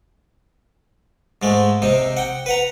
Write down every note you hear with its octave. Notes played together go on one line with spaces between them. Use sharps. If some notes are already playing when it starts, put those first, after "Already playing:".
G#2 G#3 A3
C3 C4 D#4
F#5 G5
B4 F#5 A#5